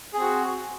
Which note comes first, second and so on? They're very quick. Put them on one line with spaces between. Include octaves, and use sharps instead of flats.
G#4 C4 F#4